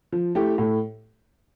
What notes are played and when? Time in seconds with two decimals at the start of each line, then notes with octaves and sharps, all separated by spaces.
0.12 F3
0.35 A3 E4 G4
0.58 A2